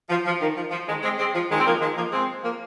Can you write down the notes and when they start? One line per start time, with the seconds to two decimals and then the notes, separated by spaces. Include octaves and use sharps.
0.09 F3
0.25 F3
0.40 D#3
0.56 F3
0.71 F3
0.87 D#3 G#3
1.02 G#3 C4
1.18 G#3 C4
1.34 F3
1.49 D#3 G#3
1.58 C4
1.65 F3 A#3
1.80 D#3 G#3
1.96 F3 A#3
2.11 G#3 C4
2.43 F3 A#3